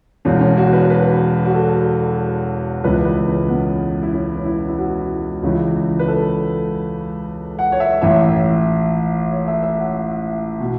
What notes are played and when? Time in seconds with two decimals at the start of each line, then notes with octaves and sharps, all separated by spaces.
0.25 E1 E2 E3 C#4
0.40 C#4
0.57 F#4
0.73 B4
0.90 B4
1.46 F#4
1.54 A4
2.84 C#2 C#3 E3 B4
3.05 B4
3.27 C#4
3.49 B3
4.03 E4
4.13 C#4
4.37 C#4
4.45 E4
4.68 E4
4.78 F#4
5.43 C#2 C#3 E3
5.99 B4
6.08 A4
7.59 F#5
7.72 C#5
7.80 E5
8.02 A1 A2 E3 E5
9.32 C#5
9.48 E5
9.63 E5
9.79 F#5
10.60 B2